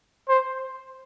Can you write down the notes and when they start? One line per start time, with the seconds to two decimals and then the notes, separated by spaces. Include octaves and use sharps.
0.29 C5